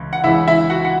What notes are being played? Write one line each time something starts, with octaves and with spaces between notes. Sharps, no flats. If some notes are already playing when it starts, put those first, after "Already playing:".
Already playing: C#2 E3
F#5
C#2 C#3 E3 E4 E5
E4 E5
F#4 F#5
F#5